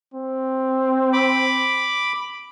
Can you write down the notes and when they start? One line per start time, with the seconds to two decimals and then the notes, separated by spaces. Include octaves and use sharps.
0.14 C4
1.13 B5 D6